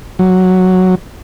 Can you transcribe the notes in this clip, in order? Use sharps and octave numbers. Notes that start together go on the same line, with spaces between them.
F#3